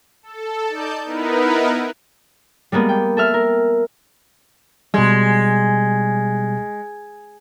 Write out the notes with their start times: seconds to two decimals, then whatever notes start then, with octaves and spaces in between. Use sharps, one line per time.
0.23 A4
0.69 D#4 D5 A5 G6
1.05 B3 D#4 E4 A#4 B4
2.72 G3 G#3 A#3 B3
2.89 G5
3.17 A4 E5 F6
3.34 A#4
4.94 B2 G3 G#3